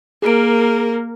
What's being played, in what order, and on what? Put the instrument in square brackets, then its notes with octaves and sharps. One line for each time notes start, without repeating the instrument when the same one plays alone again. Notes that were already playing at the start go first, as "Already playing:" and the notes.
[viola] A#3 A#4 [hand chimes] G#4 D7